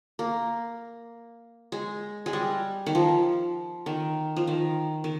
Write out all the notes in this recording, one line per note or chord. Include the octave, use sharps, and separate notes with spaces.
A#3
G#3
G#3
G3
D#3
F3
D#3
F3
D#3
D#3